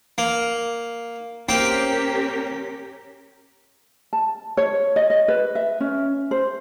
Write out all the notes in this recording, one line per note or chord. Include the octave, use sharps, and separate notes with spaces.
A#3
A#3 C4 C#4 G4 A#4 G5
A5
C#5
D#5
D#5
B4
E5
C#4
C5